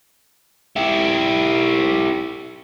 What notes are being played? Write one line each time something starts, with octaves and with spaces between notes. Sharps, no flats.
E4 G4